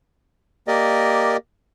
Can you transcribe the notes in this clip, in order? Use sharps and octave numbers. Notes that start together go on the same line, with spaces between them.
A#3 G4 A#4 D5 D#5